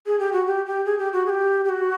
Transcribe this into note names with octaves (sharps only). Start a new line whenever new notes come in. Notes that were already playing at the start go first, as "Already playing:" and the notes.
G#4
G4
F#4
G4
G4
G#4
G4
F#4
G#4
G4
G4
F#4